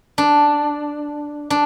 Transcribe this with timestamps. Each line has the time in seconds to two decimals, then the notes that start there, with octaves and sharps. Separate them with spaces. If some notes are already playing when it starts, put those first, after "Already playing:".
0.18 D4
1.50 D4